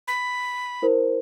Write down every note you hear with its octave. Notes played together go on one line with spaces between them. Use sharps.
B5
E4 A#4 C5